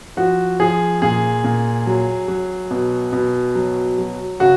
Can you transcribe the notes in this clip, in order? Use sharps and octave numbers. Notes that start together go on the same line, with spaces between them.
F3 F#4
F3 G#4
A#2 G#4
A#2
F#3
F#3
B2
B2
F#3
F#3
C#3 F#4